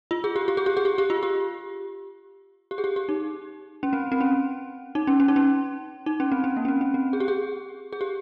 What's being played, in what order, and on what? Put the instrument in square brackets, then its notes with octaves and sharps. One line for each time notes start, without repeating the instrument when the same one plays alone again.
[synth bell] F4
G#4
G4
G4
G#4
G4
G#4
G4
G4
F4
G4
G4
G#4
G4
G4
D#4
C#4
C4
C4
C#4
D#4
C#4
C#4
D#4
C#4
D#4
C#4
C4
C#4
A#3
C#4
C4
C#4
C4
G#4
G4
G#4
G#4
G4